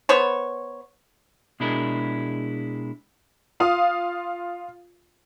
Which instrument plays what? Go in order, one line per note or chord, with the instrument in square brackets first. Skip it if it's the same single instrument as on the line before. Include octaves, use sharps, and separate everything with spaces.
[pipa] B3 C5 C#5
[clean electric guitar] B2 G#3 D4 E4 G#4 A#4
[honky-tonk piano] F4 F5 D#6